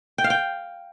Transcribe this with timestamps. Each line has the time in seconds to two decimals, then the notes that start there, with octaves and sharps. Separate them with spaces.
0.18 G5
0.24 F5
0.30 G5